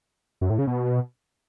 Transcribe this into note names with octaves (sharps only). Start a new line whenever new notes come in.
F#2
A2
C#3
B2